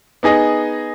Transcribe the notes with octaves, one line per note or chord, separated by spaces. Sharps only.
B3 D#4 G#4 D#5